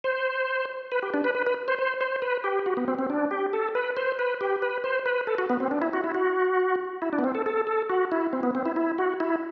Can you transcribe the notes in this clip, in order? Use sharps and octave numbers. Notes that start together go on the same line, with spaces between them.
C5
B4
G4
D4
B4
B4
B4
C5
C5
C5
B4
G4
F#4
B3
C4
C4
D4
G4
A4
B4
C5
B4
G4
B4
C5
B4
A4
F#4
B3
C4
D4
E4
F#4
E4
F#4
E4
D4
B3
C4
A4
A4
A4
F#4
E4
C4
B3
C4
E4
E4
F#4
E4